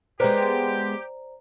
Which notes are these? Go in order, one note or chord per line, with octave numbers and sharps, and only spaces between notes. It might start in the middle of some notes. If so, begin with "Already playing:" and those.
G#3 B3 G4 C5 D5 A#5